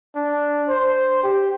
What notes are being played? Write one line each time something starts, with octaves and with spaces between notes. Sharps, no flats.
D4
C5
G4